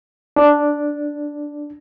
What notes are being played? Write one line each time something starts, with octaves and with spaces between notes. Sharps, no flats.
D4